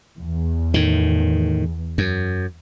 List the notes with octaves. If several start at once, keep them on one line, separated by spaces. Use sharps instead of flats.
E2
A2 D#3
F#2